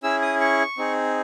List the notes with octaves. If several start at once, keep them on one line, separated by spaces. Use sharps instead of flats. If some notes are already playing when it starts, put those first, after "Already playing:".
C#4 E4 G#4 E6
D#6
C#6
C4 D#4 G#4